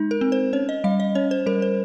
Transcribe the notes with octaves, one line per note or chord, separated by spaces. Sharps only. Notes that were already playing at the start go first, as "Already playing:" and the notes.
Already playing: G#3 D#4
A#4
C4
C5
C#4 C#5
D#5
G3 F5
D#5
C#4 C#5
C5
G3 A#4
C5